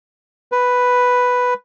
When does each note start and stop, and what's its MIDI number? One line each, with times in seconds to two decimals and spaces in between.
0.52 1.54 71